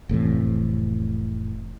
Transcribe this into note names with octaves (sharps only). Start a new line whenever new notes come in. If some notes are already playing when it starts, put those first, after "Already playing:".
F1 A2 C3 E3